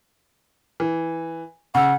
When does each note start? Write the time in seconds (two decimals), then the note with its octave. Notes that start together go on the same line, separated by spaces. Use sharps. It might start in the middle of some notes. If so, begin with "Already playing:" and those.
0.80 E3
1.75 C#3 F#5 E6